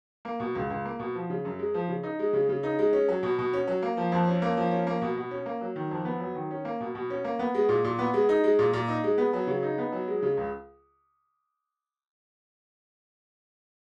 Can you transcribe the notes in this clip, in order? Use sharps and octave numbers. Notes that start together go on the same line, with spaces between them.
A#3
B2
C#2
C#2
A#3
B2
F3
C#3
F#2
G#3
F3
C#3
D#4
G#3
C#3
C#3
D#4
G#3
C#4
F#3
B2
B2
C#4
F#3
A#3
F3
F2
C#4
A#3
F3
C#4
A#3
B2
B2
C#4
A#3
F#3
D#3
F2
B3
F#3
D#3
C#4
A#3
B2
B2
C#4
A#3
B3
G#3
A#2
A#2
B3
G#3
D#4
G#3
A#2
A#2
D#4
G#3
B3
F#3
C#3
D#4
B3
F#3
G#3
C#3
C#2